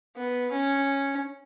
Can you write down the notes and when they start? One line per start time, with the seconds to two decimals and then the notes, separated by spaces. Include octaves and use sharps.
0.16 B3
0.52 C#4